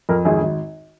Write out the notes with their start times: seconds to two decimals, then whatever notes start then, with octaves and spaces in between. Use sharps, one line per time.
0.09 F2 A#4
0.25 G#1 G#4
0.42 G#1